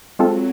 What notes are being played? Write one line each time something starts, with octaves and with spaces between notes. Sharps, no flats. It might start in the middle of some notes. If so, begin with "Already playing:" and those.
F#3 G#3 C4 F4 A4